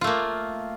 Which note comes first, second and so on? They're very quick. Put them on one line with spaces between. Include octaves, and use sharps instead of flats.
F4 A3 A#3